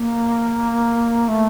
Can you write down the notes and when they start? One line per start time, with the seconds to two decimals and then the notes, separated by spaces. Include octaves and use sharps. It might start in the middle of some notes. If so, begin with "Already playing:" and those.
Already playing: A#3
1.28 A3